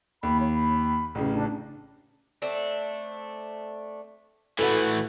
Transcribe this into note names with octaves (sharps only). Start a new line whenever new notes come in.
D#2 B5
C#5
B5
A1 C#3
D4
A3 C4 D4
A2 E3 F#4 A4 B4 F#5